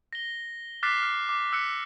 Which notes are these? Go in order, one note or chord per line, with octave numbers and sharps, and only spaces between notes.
A#6 G7
D6 F6 F#6 A6 B6 C7
F6
D6
E6 F#6 B6 C#7